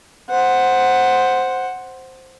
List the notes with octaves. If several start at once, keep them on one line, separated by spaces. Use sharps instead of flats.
C5 F#5